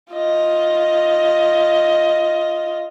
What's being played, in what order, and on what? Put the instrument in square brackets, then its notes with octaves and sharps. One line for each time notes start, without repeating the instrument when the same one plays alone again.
[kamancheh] F4 D#5